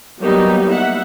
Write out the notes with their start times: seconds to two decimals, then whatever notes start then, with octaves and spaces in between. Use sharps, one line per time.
0.21 F#3 G3 A#3 B3 D#4 G4
0.73 E5 F#5